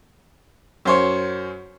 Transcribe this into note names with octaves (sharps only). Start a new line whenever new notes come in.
F#2 C5 C#5